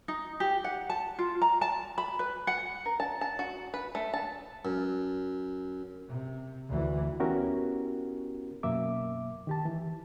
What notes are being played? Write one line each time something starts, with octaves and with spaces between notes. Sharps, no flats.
D#4
G4
F#5
A5
F4
A#5
A5
B5
B4
F#5
A#4
A5
A5
F#4
B4
A3
A5
F#2
C3
D2 E3
B3 C#4 E4 F#4 G4 A#4
F#2 B2 A#3 E5 D6
D#3 G4 A5
E3